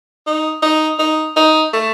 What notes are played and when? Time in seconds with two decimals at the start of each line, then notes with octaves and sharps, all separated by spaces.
0.26 D#4
0.62 D#4
0.99 D#4
1.37 D#4
1.73 A3